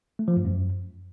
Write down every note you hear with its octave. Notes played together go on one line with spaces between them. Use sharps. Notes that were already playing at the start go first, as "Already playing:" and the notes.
A3
F3
G2
F#2